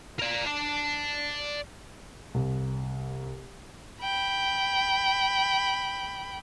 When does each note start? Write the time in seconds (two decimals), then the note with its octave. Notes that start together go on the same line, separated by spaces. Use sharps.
0.19 A#4 D5
0.46 D5 A5
2.34 C2
4.02 G5 B5